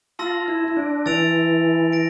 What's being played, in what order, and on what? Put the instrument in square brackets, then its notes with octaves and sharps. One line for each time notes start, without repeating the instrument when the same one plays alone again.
[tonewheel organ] F4 [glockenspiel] A5 C6 E6 A#6
[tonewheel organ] E4
E4
D4
[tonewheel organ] E3 [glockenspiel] E6 A6 D7 F7
[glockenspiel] A#6 D7